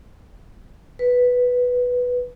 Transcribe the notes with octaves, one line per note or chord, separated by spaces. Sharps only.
B4